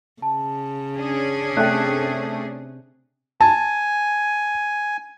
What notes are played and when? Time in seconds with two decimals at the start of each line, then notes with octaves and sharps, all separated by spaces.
0.22 C#3 A5
0.96 C#4 D4 G#4
1.57 C3 A3 E5 G5 F#6
3.41 G#5 A5